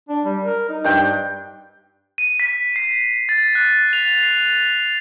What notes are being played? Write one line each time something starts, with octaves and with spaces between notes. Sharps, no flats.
D4
G3
A#4
D#4
G2 G5
D#7
B6
C7
A6
F#6
F7
C7